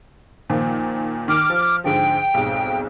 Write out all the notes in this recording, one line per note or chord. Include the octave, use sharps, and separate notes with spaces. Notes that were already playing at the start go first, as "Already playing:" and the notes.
A#2 D#3 F3
D#3 D6 F6
F3
G#2 D3 F3 G5
B1 F2 G#2